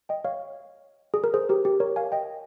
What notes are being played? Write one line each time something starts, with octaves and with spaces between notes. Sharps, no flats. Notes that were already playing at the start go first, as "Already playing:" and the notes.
D#5 G5
C#5 F5
G#4
A#4
G#4 C5
G4 A#4
G4
A#4 C#5
F5 G#5
D#5 G5